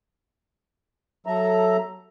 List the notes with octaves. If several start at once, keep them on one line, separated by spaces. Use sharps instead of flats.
F#3 A4 E5 A#5